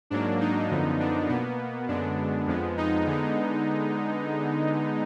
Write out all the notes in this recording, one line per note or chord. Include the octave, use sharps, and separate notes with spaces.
G#2 F#3 A#3 D4
D#4
F#2 D3 F3 B3
D4
B2 A#3 B3
F#2 D3 G#3 B3 D4
F2 F3 G#3 B3
D#4
D3 G#3 B3